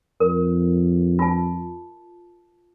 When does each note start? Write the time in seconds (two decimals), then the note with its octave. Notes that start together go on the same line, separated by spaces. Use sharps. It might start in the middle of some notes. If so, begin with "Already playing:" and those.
0.20 F2 A#4
1.19 F4 A5